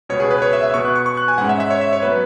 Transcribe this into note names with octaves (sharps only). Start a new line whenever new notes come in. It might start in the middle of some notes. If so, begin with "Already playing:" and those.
C#2 B2 B3 C#5
G#4
B4
C#5
E5
E5
B2 B3 C#6
F#6
C#6
C#6
F#6
G#5
G#2 G#3 C#4 F#5
E5
E5
C#5
E5
C#5
F#3 B3 B4